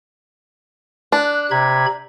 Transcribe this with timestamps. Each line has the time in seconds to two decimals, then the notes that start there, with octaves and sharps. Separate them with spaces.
1.12 D4 F#6
1.51 C3 A#5 B5 G#6